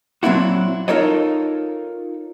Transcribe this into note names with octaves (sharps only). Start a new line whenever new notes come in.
A#2 F#3 C4 D4 E4 F#4
D#4 F4 A4 A#4 C#5 D#5